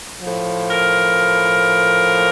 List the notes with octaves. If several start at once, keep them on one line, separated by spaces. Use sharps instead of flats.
A2 F3
A#4